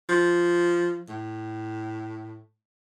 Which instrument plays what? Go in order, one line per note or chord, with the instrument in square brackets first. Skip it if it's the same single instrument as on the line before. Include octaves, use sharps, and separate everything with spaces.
[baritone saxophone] F3
A2